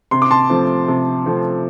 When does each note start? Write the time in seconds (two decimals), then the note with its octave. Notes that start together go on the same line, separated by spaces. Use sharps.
0.11 C3 C6
0.22 D6
0.31 A5 C6
0.49 F3 A3 C4
0.88 C3
1.26 F3 A3 C4